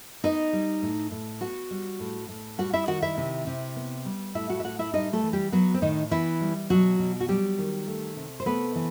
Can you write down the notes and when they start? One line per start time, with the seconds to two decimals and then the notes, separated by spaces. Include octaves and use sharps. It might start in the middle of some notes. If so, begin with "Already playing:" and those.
0.24 B3 D#4 D#5
0.53 G3
0.82 A2
1.11 A2
1.41 B3 F#4 F#5
1.71 G3
2.00 A2
2.29 A2
2.58 G3 F#4 F#5
2.73 E4 E5
2.87 D#3 F#4 F#5
3.02 E4 E5
3.18 C3
3.47 C3
3.76 B3
4.05 G3
4.35 A2 E4 E5
4.49 F#4 F#5
4.60 E5
4.64 A2 F#4 F#5
4.79 E4 E5
4.93 G3 D#4 D#5
5.13 A3 A4
5.23 E3
5.33 G3 G4
5.52 F#3 B3 F#4
5.74 C4
5.82 A2 D#3 D#4
6.11 E3 B3 E4
6.41 G3
6.70 B2 F#3 F#4
6.99 B2
7.21 F#4
7.28 F#3 G3 G4
7.58 D#3
7.87 A3
8.17 C3
8.40 C5
8.46 A3 B3 B4
8.75 E3